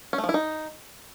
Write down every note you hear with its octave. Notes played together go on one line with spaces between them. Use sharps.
C#4
A3
F3
E4
D#4